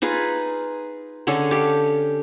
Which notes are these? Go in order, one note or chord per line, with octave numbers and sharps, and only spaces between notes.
D#4 F4 G#4 B4
D3 C#4 G#4 A4
G4 F5